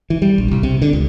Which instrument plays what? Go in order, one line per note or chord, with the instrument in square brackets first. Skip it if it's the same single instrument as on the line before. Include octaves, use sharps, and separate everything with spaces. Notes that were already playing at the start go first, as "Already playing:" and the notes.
[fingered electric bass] E3
G3
A#1
C2
C3
D3
C#2